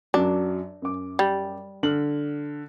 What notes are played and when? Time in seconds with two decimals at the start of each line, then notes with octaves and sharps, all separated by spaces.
0.14 F#2 F#3 D4
0.82 F#2 D6
1.19 G3
1.83 D3 F6 F#7